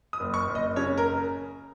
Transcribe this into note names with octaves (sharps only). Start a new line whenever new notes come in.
D#6
F#1
C#6
F#1
D#5
C#3 C#5
A#4